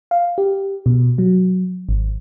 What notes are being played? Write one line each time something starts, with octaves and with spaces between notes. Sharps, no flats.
F5
G4
B2
F#3
G#1